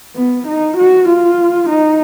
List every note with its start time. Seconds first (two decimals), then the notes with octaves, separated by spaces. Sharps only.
0.16 B3
0.47 D#4
0.78 F#4
1.09 F4
1.69 D#4